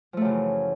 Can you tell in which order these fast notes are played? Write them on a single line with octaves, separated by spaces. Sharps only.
F3 A3 F#2 C#3 E3